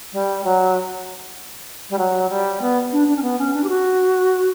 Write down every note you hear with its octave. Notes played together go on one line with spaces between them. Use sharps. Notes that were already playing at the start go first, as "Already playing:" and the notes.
G3
F#3
G3
F#3
G3
B3
D4
D4
C#4
B3
C#4
D4
G4
F#4